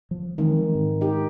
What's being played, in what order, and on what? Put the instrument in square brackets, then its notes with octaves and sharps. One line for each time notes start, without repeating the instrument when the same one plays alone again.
[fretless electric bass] F3
[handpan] D#3 [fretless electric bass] E3 G#3 C4
[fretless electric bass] G#2
[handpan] D#4 G4